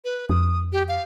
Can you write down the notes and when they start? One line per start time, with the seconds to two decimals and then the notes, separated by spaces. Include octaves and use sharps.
0.05 B4
0.29 F2 D#6
0.73 G4
0.88 F5